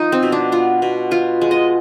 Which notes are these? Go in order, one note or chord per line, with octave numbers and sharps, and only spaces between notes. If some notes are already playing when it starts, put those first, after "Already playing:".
Already playing: F3 D#4
C4
B2
D4
B3 F4
B2
B3 F4
G#3
D#5